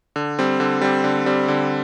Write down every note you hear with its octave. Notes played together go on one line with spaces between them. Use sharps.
D3
G3 C4
D3
G3 C4
D3
G3 C4
D3